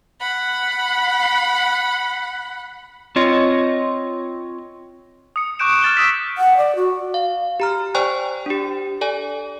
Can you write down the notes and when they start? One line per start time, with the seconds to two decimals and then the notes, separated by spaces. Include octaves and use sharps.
0.20 F#5 B5
3.16 C4 F4 C#5 D#5
5.36 D#6 C#7
5.59 C#6 D6 F#6 G6 D7 E7
5.82 F6 G6 A6 E7 G7
5.97 D#6 E6 B6
6.38 F#5
6.57 D5
6.76 F#4
7.14 F5
7.60 G4 A#5 F6
7.95 C5 D5 G5 G#5 C#6 F#6
8.46 D4 G4
9.01 A4 D5 G#5